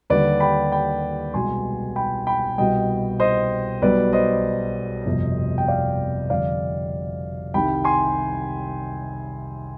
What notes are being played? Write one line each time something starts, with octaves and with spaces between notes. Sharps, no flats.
D#2 D3 G3 B4 D5
G5 B5
G5 B5
C2 B2 G#3 G#5 C6
G5 B5
G5 B5
C2 B2 G3 D#5 G5
C5 D#5
B1 B2 G3 B4 D5
C5 D#5
G1 F2 C3
G5
D5 F5
F2 D3 G3 D5 F5
C2 C3 D#3 G3 G5 B5
G#5 C6